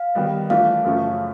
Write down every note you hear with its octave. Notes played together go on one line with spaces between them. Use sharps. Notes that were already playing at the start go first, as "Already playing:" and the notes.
Already playing: F5
D#3 G3 B3
E3 A3 D4 F4 F5
F#2 C#3 F3 A3 C#4